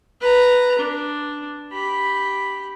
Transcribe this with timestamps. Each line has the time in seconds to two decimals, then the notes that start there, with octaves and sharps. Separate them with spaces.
0.21 B4 A#5
0.78 D4
1.72 G4 B5